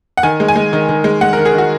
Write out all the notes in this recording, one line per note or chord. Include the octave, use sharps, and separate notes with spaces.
F#5
D#3 G#5
G#3
G#5
G#3
D#3
D#3
G#3
G#3 F#5
A#4
D#3
G#4
D#3
F#4